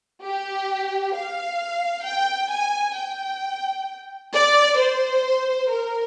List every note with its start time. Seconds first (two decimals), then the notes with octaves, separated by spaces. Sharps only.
0.23 G4
1.15 F5
2.05 G5
2.51 G#5
2.96 G5
4.33 D5
4.79 C5
5.70 A#4